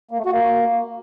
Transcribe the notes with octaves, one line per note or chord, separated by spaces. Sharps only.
A#3
A3
F#4
A#3